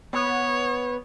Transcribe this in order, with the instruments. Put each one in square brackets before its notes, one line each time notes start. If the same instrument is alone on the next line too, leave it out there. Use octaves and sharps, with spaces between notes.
[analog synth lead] B3 [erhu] C#5